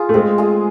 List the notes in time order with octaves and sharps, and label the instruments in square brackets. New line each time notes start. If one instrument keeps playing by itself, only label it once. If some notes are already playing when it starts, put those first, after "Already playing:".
Already playing: [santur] F4 G#4
[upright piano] A3
[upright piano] G#3 [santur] C4
[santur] F4 G#4